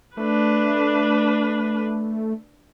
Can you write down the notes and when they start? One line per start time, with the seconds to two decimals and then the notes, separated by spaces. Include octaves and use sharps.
0.17 A3 D4 B4